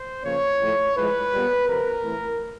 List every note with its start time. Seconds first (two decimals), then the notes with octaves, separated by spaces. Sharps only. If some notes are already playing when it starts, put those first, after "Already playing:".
Already playing: C5
0.24 C#3 F3 A#3 C#5
0.60 A2 F3 A3
0.95 A2 F3 G#3 B4
1.31 A#2 G3 B3
1.67 F2 C3 F3 A#4
2.02 A2 E3 A3